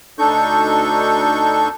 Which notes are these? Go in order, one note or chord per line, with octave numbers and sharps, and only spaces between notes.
D2 D4 D#4 A4 C#6 G6